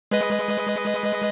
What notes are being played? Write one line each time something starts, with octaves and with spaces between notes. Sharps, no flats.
G#3 B4 D#5